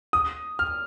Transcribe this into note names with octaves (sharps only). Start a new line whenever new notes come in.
D#6
F6